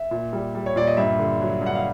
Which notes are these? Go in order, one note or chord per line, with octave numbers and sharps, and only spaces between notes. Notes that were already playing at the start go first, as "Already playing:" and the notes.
Already playing: E5
A#2
G3
G3
C#5
A#2 D5
D#5
G2 E5
D3
F#3
G2 F#5
F5